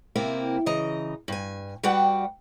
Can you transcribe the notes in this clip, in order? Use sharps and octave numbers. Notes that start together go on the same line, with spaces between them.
C3 A#3 C4 E4
C#3 E3 D#5 A#5
G2 G#5
G3 F#4 B4 D5 F#5 G5